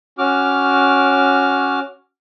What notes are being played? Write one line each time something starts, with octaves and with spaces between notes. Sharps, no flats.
C#4 F#4 D6 F6